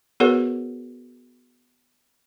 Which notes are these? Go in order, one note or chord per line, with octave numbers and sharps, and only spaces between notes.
B3 F#4 G#4 A#4 B4 C#5